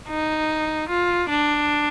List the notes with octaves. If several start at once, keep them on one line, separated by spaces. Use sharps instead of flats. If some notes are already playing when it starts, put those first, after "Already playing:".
D#4
F4
D4